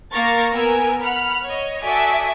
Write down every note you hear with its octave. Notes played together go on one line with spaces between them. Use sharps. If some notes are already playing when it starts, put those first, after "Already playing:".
A#3 A#4 A#5 C#6 A6 A#6
B3 A#4 G#5 E6 G#6
F#5 B5 F6
C#5 D#5
F#4 A4 D5 E5 G#5 D#6